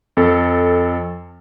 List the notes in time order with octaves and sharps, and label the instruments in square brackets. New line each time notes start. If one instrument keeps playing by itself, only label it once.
[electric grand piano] F2 A4